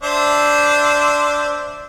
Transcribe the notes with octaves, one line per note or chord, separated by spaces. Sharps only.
D4 C5 E5